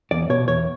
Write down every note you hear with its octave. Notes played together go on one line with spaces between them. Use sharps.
E2 D5
B2 C#5
E2 C#5